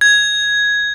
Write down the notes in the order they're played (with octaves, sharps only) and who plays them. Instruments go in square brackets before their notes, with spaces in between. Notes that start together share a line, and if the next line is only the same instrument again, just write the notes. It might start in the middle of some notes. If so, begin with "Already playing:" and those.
[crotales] G#6